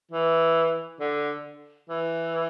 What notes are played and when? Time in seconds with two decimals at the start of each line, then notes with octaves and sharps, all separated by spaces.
0.11 E3
1.00 D3
1.90 E3